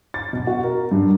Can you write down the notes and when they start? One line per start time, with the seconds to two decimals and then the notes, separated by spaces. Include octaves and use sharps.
0.14 A6
0.33 B2
0.47 F#4
0.64 A#4
0.91 G2